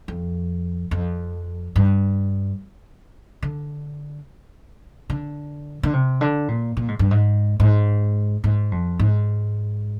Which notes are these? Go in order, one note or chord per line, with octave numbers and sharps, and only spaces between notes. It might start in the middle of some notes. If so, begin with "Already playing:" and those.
F2
F2
G2
D3
D3
D3
C3
D3
A#2
A#2
G#2
G2
G#2
G#2
G#2
F2
G#2